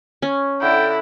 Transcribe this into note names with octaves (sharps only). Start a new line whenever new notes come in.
C#4
D3 D4 E4 G5